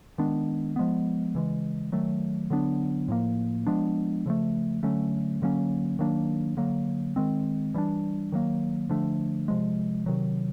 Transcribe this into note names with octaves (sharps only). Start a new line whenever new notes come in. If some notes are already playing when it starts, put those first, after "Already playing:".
D#3 G#3 B3 D4
F3 G#3 B3
C#3 E3 G#3
D#3 F#3 A3
D3 F#3 B3 D4
A2 F3 A#3
F3 G#3 B3 D4
C#3 F3 A3
D3 F#3 A3 C#4
D3 F#3 A#3 C#4
D#3 F#3 A#3 D4
D3 F#3 A#3
D#3 G#3 C4
E3 G3 A#3 D4
D#3 F#3 A#3
D3 F3 A3 D4
C3 F3 G#3
C3 D#3 F#3